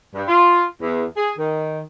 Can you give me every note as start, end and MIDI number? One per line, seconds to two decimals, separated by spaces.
0.14 0.24 43
0.28 0.63 65
0.82 1.04 40
1.16 1.31 68
1.39 1.80 51